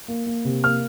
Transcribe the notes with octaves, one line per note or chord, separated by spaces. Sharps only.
A#3
A#3
C3
A#3 F6